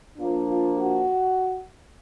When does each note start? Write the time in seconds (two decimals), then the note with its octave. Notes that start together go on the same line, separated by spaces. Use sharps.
0.17 F3 A#3 D4 F4
0.47 F4
0.76 F#4